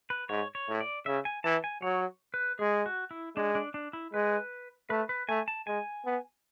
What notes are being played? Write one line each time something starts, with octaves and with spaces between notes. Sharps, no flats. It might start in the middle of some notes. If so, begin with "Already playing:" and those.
B4
G#2 C#5
C#5
A2
D5
C#3 E5
G#5
E3 A5
G#5
F#3 C#5
B4
G#3 G#4
F#4
E4
G#3 D4
D4
D4
E4
G#3 B4
A3 B4
B4
A3 G#5
A5
G#3 G#5
B3